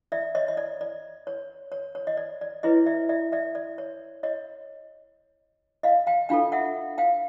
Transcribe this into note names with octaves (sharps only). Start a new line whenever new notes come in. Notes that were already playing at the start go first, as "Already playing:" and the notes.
D5 E5
C#5 D#5
D#5
D5
D5
C#5
C#5
C#5
D#5
D5
D5
E4 G#4 B4 C#5 D#5
D5 E5
D5 E5
D5 E5
D5
C#5
C#5 D#5
D#5 F5
F5 G5
D4 F4 A4 F5 G5
E5 F#5
F5 G5